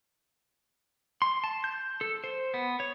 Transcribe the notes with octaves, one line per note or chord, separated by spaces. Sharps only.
C6
A5
G6
A4
C5
B3
C#5